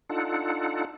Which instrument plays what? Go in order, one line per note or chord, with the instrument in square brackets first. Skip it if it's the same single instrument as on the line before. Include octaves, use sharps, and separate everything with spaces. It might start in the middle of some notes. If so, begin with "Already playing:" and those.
[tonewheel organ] D4 D#4 F4 A4 F#5